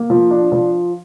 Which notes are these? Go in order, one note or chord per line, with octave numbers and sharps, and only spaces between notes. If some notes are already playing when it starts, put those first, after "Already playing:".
Already playing: A#3
F3
D4
F3